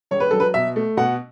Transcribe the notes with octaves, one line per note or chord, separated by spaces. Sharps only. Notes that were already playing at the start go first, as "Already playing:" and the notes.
E1 C#5
B4
F#3 A4
B4
B2 E5
A3
B2 F#5